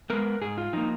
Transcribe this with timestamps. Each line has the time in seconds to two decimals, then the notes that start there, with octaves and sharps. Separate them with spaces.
0.10 G#3 B3 A#4
0.41 G#2 G#4
0.58 F4
0.73 F3 A#3 D#4